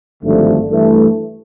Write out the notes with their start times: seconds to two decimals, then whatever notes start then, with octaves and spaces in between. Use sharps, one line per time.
0.22 G#1 G2 D3 F3 A3
0.69 G2 E3 A3